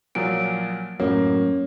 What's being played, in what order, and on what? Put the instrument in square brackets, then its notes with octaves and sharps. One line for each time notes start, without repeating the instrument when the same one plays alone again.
[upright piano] A#2 F3 F#3 [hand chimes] D7
[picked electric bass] F#2 A2 F#3 [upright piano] A#3 [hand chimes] C#4 C#5